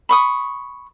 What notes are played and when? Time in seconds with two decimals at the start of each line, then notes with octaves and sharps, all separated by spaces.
0.09 B5 C#6 D#6